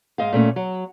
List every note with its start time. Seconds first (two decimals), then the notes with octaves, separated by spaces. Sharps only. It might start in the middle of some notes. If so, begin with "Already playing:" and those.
0.18 G#2 D#5 F5
0.33 A#2 A3 C#4
0.56 F#3